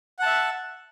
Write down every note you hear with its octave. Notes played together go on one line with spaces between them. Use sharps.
E5 F#5 A5